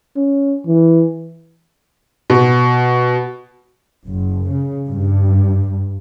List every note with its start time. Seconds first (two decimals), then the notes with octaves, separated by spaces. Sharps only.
0.16 C#4
0.67 E3
2.30 B2
4.06 F#1
4.49 C#3
4.89 G2